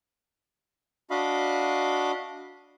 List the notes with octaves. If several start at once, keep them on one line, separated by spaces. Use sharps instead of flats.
D4 F#4 D#5 F5 B5